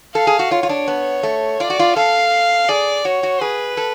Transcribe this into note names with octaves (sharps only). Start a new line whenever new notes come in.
A4 F5
G#4
F#4
F4 C#5
F4
D4
B3
A3
F4 D5
F#4
F4
A4 F5
G#4 D5
F#4 C#5
F#4
G#4 B4
A4